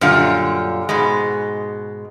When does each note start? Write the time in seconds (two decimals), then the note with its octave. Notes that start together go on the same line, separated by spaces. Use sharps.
0.01 F#2 A#2 D3 G3 F4
0.89 G#2 B2 G#3